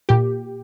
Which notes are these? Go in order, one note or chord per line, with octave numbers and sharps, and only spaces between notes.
A#2 G4